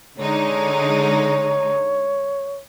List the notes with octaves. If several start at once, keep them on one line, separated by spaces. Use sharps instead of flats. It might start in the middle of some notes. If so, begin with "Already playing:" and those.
D3 G#3 D#4 C#5